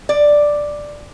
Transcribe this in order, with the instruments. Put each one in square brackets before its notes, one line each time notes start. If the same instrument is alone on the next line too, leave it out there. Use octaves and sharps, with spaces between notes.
[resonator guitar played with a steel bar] D5